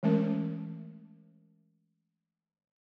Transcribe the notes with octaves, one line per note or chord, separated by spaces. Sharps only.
E3 G#3 A3 C#4 A#4